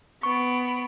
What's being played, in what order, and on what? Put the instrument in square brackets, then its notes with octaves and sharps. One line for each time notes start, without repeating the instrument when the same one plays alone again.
[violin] B3 D7 [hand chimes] C#6